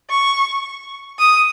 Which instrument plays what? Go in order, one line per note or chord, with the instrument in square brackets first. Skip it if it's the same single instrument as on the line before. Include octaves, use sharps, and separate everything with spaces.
[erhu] C#6
D#6